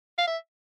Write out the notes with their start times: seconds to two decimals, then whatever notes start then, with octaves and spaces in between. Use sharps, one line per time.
0.18 F5
0.27 E5